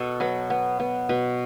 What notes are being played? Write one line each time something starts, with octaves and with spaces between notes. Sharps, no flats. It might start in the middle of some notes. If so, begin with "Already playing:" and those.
Already playing: B2 A4
F#3 B4
B3
B3
B2 B4